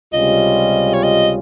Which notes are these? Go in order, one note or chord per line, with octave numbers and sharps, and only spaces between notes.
C#2 C3 G3 C#4 F4 D#5
C#5
D#5